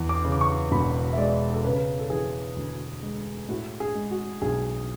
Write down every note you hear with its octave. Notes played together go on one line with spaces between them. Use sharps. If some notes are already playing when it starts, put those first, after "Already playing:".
Already playing: E2
D6
C#3
D6
C#6
E1 B5
E5
G#3 D5
A4
C#3 B4
A4
E3 G#4
D2
G#3
A2 F#4
G#4
G#3
F#4
B1 G#4